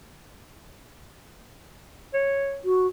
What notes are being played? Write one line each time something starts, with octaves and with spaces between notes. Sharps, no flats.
C#5
F#4